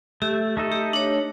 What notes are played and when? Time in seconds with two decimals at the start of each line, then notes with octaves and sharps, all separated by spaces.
0.22 A3 G4
0.57 A3 D#4 A4
0.72 G4
0.93 D4 C#5